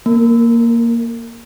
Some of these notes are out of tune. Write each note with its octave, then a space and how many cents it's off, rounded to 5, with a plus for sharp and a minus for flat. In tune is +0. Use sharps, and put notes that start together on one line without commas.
A#3 +0 A#4 -40